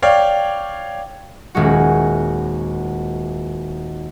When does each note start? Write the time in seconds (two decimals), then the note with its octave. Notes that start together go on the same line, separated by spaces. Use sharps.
0.02 C#5 D5 F5 G5
1.55 D#1 G#3 F#4